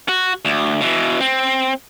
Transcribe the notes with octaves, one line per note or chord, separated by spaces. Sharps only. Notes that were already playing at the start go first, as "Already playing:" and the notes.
F#4
D2
B2 E3
C4